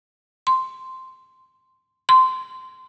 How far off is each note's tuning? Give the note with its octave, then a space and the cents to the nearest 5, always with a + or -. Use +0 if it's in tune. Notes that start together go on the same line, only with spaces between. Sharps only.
C6 -5
C6 -15